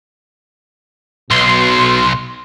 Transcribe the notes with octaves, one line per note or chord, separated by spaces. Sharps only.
B1 B2 C6